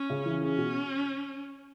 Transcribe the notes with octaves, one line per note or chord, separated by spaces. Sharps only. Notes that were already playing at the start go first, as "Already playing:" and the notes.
Already playing: C#4
C#3
E3
C#4 G#4
B2